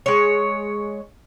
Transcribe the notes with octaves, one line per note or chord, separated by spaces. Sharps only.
G#3 C#5